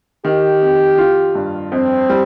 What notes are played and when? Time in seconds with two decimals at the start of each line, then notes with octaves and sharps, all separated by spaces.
0.25 D#3 G4
0.62 F2
0.98 F4
1.35 G2
1.72 F2 C4
2.10 G3